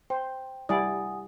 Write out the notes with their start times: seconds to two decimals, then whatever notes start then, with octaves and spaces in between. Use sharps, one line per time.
0.10 C5 G5
0.69 G3 E4 D5 F#5 G#5 D#6